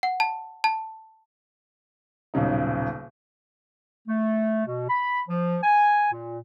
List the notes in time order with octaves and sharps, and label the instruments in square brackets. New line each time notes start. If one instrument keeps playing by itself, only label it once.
[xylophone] F#5
A5
A5
[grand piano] D#1 B1 C#3 D#4
[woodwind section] A3
B2
B5
F3
G#5
A#2